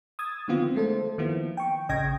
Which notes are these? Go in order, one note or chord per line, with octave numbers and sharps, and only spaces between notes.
D#6 E6 G#6 A6
D3 D#3 F3 B3 C4 F4
G#3 A3 A4 C5
D#3 F3 A#3 B3 E4 F4
G5 C#6
A1 C#3 D#5 G5 G#6 A#6